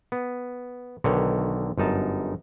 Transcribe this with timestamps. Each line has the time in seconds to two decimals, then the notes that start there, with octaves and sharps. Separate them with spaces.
0.12 B3
1.04 B1 D3 D#3 C#5
1.78 G1 F#2 D#4 A5